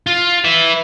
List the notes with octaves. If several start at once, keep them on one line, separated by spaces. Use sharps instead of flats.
F4
B4 E5